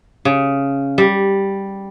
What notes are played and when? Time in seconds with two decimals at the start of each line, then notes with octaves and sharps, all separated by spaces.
0.25 C#3
0.98 G3